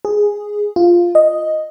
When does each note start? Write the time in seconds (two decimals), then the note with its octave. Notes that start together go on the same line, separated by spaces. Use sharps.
0.05 G#4
0.76 F4
1.15 D#5